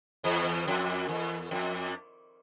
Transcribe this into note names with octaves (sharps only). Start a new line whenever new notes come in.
E2
F2
E2
F2